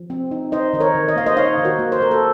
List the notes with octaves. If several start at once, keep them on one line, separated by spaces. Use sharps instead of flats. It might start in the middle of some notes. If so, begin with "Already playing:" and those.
Already playing: F3
C4
D#4
D#4 C5 D#5
D#3 D#5
A#4 C#5
D#3
D#5
A#3 F5
C5 D#5
D#4 C#5 F5
D#3
F#4 A#4
A#3
C5
A#3 A#4
A4